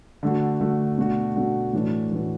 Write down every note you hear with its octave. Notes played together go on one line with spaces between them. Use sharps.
D3 A3 F#4
D3 A3 F#4
B2 A3 D4 F#4
B2 A3 D4 F#4
A2 E3 A3 D4 F#4
A2 E3 A3 D4 F#4